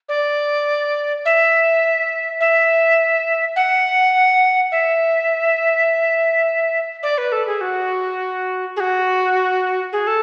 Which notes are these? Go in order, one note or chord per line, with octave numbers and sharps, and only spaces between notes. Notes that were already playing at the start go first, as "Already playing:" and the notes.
D5
E5
E5
F#5
E5
D5
B4
A4
G#4
F#4
G#4
F#4
G#4
A4